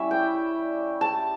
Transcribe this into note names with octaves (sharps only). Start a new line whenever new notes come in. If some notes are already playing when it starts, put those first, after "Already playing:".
Already playing: G3 C#4 E4 E5
G5
A5